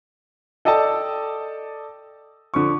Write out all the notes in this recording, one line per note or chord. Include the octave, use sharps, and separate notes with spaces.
A4 D5 D#5 G5 A5
D3 F3 C#6